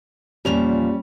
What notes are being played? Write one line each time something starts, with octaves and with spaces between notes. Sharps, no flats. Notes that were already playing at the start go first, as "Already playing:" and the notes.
E2 A#2 F3 G3 C#4 F7